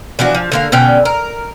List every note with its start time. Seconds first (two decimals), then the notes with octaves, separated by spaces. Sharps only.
0.19 E3 F3 D4 F#4
0.35 F3
0.52 D3 A#3 F5
0.72 B2 D3 C#4 G5
1.05 A#4